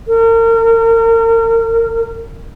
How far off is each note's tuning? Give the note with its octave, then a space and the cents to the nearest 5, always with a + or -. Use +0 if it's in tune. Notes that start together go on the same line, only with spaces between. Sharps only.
A#4 -35